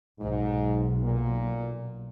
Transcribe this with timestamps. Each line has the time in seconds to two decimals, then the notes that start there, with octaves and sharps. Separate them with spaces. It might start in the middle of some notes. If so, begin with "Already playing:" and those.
0.20 B1 G#2
1.03 A#2